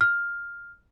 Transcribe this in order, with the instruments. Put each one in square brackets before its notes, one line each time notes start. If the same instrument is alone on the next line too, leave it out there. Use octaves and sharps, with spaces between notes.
[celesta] F6